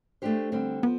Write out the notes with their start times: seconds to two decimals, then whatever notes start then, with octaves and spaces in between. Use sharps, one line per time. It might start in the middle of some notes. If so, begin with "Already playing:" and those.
0.22 A3 D4 G4 C5
0.52 D3 G3 C4
0.83 F3 B3